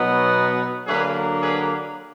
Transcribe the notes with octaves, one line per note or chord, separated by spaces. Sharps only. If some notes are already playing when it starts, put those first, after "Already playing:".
Already playing: B2 F#3 B3 D#4
D3 F#3 A#3 D4 G#4 B4
G#4 B4